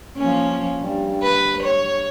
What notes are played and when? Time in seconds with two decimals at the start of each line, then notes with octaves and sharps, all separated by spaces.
0.18 F3 A#3 C#4
0.79 G2
1.23 B4
1.63 C#5